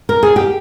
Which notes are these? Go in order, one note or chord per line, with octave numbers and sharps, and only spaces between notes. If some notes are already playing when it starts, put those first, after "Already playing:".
A#4
G#4
G4